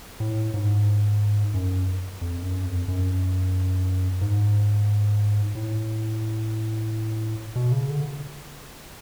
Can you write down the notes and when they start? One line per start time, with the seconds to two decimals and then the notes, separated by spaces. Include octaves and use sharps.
0.20 A2
0.54 G#2
1.54 F#2
2.21 F2
2.43 F#2
2.65 F2
2.88 F#2
4.21 G#2
5.55 A2
7.56 B2
7.72 C#3
7.90 D3